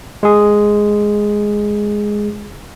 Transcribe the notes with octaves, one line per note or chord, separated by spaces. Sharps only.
G#3 G#4